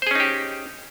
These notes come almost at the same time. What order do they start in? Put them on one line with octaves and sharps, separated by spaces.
C5 G#4 C#4 D#4 G4